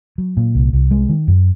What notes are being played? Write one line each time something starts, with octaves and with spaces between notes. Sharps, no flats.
F#3
A#2
C2
C2
G#3
D#3
F#2